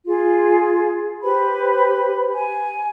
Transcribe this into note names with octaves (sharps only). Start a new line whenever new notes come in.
F4 G#4
G4 B4 C5 B5
G#5